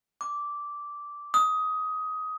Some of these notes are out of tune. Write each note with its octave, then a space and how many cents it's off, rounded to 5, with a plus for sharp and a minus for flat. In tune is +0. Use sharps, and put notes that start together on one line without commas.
D6 -10
D#6 +15